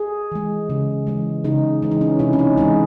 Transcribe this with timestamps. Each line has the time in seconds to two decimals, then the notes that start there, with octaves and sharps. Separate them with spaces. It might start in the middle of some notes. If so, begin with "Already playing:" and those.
Already playing: G#4
0.32 E3 G#3
0.70 C#3
1.07 E3 G#3
1.44 C#3 D#4
1.82 E3 G#3
1.91 D#4
2.01 C#4
2.19 C3 E4
2.33 C#4
2.39 D#4
2.57 E3 G#3 D#4